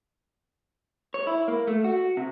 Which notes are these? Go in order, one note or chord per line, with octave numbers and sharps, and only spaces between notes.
C#5
E4
A#3
A3
F#4
C3